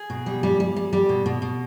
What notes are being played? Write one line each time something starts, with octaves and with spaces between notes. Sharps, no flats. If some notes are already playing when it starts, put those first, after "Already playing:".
Already playing: G#4
B2
G3
G3
G3
G3
G3
B2
B2
B2